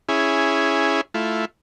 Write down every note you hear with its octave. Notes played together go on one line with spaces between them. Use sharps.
C#4 E4 G#4
A3 E4 F4